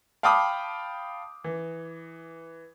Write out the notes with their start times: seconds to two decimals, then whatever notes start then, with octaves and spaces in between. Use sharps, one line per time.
0.23 F5 G5 A5 B5 D6 D#6
1.44 E3